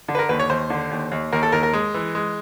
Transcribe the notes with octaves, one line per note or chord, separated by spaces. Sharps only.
D3
B4
A#4
D#2 B4
C#5
D#2 C5
D3
D#2
D#2
D#2 A#4
A4
D#2 A#4
A#4
G#3
E3
G#3